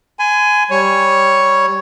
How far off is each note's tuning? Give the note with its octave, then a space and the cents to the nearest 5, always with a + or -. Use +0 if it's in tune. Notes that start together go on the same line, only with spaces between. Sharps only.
G#5 +10 C6 -45
G3 +0 C#5 +0